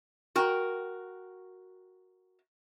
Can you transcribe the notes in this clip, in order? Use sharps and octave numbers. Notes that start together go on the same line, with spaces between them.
F#4 A#4 G5